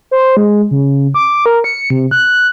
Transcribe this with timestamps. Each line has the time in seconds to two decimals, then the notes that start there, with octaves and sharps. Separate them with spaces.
0.11 C5
0.37 G#3
0.71 C#3
1.14 D6
1.46 A#4
1.64 C#7
1.90 C3
2.11 F#6